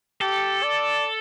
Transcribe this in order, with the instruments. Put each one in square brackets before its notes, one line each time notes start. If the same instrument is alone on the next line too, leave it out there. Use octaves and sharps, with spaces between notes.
[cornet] G4 [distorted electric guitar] A4
[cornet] D5